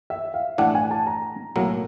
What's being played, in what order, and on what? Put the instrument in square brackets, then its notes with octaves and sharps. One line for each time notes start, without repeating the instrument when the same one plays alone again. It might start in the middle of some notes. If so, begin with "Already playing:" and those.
[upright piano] E5
F5
[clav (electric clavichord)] A2 E3 A3 D4 [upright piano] F#5
[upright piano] G#5
A5
A#5
[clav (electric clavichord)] B1 A2 F#3 A#3